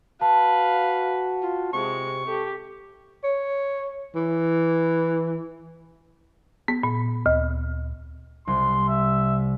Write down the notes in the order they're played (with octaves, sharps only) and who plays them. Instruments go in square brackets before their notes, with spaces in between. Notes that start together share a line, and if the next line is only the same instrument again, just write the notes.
[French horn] F#4 [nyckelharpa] B4 [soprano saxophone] F5 [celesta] A5
[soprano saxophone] F4
[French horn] C3 [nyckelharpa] G#3 [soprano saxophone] C#6
[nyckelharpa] G4 [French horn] A4
[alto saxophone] C#5
E3
[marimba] B3
A#2
D2
[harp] C2 [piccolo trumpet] C6
[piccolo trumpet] E5